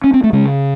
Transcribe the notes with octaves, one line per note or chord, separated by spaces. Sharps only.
C#4
C4
A3
C#3 G#3